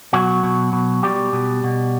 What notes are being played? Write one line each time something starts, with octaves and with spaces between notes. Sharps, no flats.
B2 F#3 F#4
B2
B2
B2 G3 G4
B2
B2